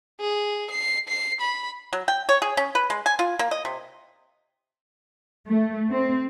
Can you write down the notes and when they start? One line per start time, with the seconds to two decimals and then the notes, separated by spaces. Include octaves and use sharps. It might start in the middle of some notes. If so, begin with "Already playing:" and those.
0.20 G#4
0.71 C7
1.09 C7
1.41 B5
1.93 F#3
2.08 G5
2.29 C#5
2.42 G#4
2.57 C#4
2.75 B4
2.90 G#3
3.06 G#5
3.19 F4
3.39 A#3
3.51 D#5
3.65 C3
5.47 A3
5.88 C4